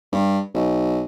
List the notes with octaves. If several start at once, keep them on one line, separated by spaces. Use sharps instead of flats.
G2
B1